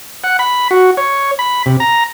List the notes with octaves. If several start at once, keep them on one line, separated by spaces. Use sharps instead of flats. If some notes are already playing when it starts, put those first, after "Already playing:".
F#5
B5
F#4
C#5
B5
C3
A#5